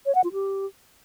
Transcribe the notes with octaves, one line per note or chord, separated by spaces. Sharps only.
C#5
F#5
F4
G4